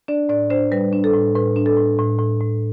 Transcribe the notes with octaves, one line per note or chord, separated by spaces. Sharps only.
D4 D5
A2 D5
D4 C5
G3 B4
D4
A4
A2
A2 B4
D4
A4
A2
A2
A2
A2